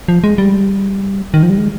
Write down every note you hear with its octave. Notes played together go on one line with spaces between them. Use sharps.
F3
G#3
G3
D#3
F3
G3
G#3